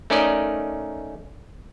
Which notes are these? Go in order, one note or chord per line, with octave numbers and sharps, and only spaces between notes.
A3 C#4 D#4 A#4 D5 D#5